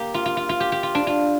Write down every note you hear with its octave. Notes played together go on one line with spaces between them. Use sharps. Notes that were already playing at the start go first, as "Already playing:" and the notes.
Already playing: A#3 G4
F4
F4
F4
F4
G4
G4
F4
D4
F4